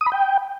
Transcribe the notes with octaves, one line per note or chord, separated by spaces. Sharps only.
D#6
B5
G5